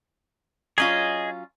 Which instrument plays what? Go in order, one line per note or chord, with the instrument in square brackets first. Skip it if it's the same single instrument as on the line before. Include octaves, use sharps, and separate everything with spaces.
[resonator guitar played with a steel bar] F#3 C#4 F4 [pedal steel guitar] G#4 D#5